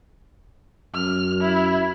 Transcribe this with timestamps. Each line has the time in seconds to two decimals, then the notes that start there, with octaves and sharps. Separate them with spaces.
0.94 F#2 F6
1.41 E4